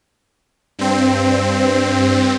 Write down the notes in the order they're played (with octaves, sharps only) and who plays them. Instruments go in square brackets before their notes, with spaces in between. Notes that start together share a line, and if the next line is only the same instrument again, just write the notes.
[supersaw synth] G2 C4